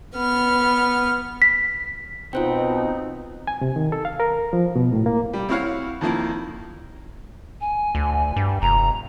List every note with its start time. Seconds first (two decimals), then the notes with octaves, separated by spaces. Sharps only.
0.15 B3 F6
1.42 B6
2.33 B2 C4 D#4 F4 C5 G5
3.47 G#5
3.61 C3
3.76 D#3
3.92 A4
4.05 F5
4.20 A#4
4.53 F3
4.76 B2
4.93 A2
5.06 A#3
5.33 G3
5.49 C4 E4 F#4 C#5 F5 F#5
6.01 F2 D#3 F3 A#3 E4
7.61 G#5
7.95 D2
8.36 G2
8.62 F1 A#5